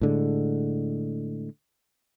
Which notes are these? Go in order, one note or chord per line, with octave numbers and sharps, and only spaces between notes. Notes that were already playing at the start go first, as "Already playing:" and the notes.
A2 D3 G#3